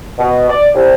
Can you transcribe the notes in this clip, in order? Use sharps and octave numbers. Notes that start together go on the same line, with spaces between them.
B2
D5
C2